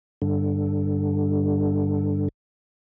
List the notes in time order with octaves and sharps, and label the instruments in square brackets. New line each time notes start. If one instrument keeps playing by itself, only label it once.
[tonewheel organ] G2 D3